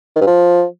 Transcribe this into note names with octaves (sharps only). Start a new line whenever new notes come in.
D#3
G2
F3